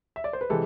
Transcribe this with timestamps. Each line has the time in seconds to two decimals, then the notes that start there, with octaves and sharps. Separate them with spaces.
0.16 E5
0.24 D5
0.33 C5
0.41 B4
0.49 C3 E3 G#3 A4